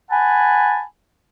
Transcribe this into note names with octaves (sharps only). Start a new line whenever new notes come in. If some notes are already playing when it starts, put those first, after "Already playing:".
F#5 G#5 A5 B5